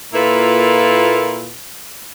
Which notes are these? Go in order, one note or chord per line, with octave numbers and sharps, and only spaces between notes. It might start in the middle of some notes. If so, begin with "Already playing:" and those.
A#2 A#3 E4 F4 A4 B4